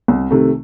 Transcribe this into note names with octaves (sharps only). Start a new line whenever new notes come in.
C2
C3 D#3 A3